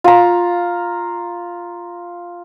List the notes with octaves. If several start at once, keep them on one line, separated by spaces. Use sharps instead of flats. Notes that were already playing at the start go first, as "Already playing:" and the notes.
F4 A#5